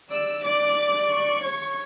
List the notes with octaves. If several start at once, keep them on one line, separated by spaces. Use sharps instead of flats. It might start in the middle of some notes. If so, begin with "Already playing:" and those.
D5 E6
D5 D6
D6
C#6
C#5